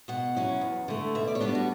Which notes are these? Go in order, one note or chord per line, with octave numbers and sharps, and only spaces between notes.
B2 F#5
F#3 C#4 E4
E2
D3 A3
B2 E5
D5
C#5
G3 B3 D4 D5
F#4